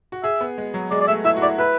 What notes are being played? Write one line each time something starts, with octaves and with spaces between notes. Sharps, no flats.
F#4
G#4 E5
B3
G#3
F#3
G#3 D5
D5
A3 E5
E4 E5
F#4
E4 D5
E4 B4